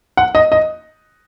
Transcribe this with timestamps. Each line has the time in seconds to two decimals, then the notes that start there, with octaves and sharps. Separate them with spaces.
0.17 F#5
0.35 D#5
0.52 D#5